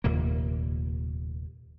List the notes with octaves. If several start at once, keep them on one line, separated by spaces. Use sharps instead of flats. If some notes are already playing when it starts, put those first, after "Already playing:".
F1 D#2 A#2 A#3